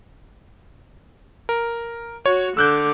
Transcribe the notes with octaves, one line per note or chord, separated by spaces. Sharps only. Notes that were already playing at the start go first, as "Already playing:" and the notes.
A#4
F#4 C#5
D3 D6 E6 F#6 G6